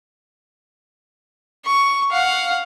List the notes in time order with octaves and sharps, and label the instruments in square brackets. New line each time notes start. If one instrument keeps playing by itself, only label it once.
[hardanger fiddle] C#6
F5 F#5